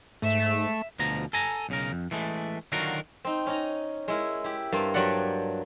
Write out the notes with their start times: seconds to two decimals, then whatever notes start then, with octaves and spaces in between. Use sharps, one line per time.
0.22 G#2 A3 E5
0.99 D2 B2 F3 A#5
1.33 A4 G#5 A#5
1.69 B1 C#3 A#4
1.92 F2
2.11 E3 G#3 A3
2.72 D3 D#3 F#3 F4 F#4 A#4
3.25 C4 D#4
3.47 C#4 D#4 A#5
4.08 G#3 E4 A#4
4.44 E4 G4
4.73 G2 A#3 C4 A5
4.94 G2 F#3 G3 D5 F#5